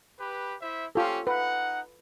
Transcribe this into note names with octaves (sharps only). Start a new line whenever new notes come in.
G4 B4
E4 C5 E5
C#4 F4 G4 A4
D#4 B4 F#5